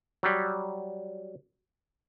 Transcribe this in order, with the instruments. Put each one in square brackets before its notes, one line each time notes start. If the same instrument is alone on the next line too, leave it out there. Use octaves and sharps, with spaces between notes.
[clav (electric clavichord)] F#3 G3